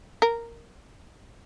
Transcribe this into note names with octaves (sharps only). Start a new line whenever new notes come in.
A#4